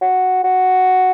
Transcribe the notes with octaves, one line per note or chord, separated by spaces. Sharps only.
F#4
F#4